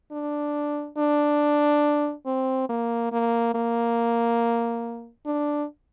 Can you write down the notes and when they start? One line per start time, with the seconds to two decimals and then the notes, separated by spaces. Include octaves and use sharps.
0.12 D4
0.97 D4
2.26 C4
2.69 A#3
3.12 A#3
3.55 A#3
5.26 D4